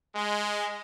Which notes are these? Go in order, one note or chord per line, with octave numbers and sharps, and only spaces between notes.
G#3